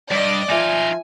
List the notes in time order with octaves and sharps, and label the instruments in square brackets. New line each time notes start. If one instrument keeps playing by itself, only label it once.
[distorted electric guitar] G2 [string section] D5 D#5
[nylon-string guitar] F3 E5 [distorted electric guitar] D#4 F4 [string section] G#5